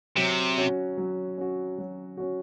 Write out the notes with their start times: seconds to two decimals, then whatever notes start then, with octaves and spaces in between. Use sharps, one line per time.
0.17 C3 F#3
0.58 C#4 F#4
0.97 F#3
1.38 C#4 F#4
1.78 F#3
2.17 C#4 F#4